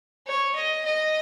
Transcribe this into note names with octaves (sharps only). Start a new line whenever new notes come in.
C#5
D#5
D#5